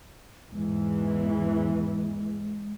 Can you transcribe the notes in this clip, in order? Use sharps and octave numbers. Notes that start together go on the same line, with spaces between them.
E2 G#2 E3 G#3